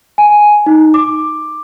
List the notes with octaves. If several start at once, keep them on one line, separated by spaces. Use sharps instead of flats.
G#5
D#4
D6